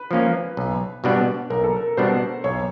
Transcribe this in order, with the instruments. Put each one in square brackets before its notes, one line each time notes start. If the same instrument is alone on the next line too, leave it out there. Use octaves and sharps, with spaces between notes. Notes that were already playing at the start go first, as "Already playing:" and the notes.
Already playing: [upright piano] B4
[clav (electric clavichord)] F3 A#3 C#4
B1
B2 G3 B3 D4
[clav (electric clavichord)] B1 [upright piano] A#4
[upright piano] A4
A#4
[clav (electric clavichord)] B2 G3 B3 D4 [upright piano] C5
[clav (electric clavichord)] B1 [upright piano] C#5